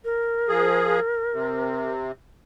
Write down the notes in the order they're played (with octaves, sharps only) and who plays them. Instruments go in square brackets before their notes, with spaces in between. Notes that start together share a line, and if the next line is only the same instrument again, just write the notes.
[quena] A#4
[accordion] F3 G#4
C3